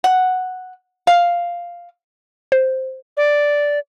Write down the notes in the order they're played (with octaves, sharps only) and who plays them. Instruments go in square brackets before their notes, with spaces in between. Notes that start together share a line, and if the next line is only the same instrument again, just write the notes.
[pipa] F#5
F5
[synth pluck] C5
[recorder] D5